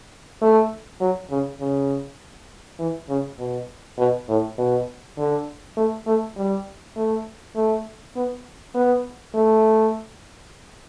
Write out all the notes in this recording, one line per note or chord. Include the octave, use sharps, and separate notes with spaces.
A3
F#3
C#3
C#3
E3
C#3
B2
B2
A2
B2
D3
A3
A3
G3
A3
A3
B3
B3
A3